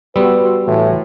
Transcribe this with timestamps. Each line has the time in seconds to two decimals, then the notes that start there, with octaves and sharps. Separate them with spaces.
0.16 G3 B3 F#4 B4 C6 E6
0.67 A2 E3